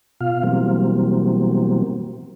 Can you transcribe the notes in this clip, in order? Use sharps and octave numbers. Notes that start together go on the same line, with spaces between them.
B2 F4 F5
B2 E3 F#3 G3 A#3 C4